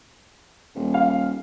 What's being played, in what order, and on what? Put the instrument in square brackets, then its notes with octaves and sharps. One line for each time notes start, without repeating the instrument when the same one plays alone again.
[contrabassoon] D#1
[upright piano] F5